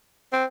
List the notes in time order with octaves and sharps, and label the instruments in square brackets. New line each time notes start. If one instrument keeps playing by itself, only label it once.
[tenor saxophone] C4